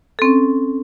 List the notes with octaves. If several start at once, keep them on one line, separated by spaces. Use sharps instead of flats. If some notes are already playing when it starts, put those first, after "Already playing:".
C4 C#4 A4